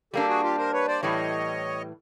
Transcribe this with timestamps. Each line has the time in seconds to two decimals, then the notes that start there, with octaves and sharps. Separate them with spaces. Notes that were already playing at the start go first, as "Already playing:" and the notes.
0.13 G3 A#3 D4 G4 A4
0.28 F#4 G#4
0.43 F4 G4
0.58 A#4 C5
0.73 B4 C#5
0.87 C5 D5
1.02 A2 E3 G3 C#5 D#5